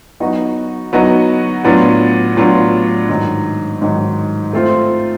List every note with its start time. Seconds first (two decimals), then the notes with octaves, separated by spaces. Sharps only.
0.20 F#3 B3 D#4 F#4
0.93 F#3 B3 D#4 F#4
1.64 A2 F#3 B3 D4 F4
2.37 A2 F#3 B3 D4 F4
3.09 G#2 D#3 F#3
3.81 G#2 D#3 F#3
4.53 A3 C4 F4